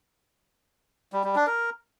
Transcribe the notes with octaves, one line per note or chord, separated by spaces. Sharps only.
G3
G3
D4
A#4